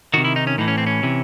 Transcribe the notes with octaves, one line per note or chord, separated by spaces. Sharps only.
C3 D#3 F#4
E4
D#4
C#4
A2 E3 D#4
C#4
C4
C#4
C3 E3